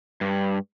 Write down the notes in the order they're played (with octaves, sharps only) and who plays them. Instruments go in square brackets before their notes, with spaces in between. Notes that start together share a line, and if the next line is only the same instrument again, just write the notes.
[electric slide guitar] G2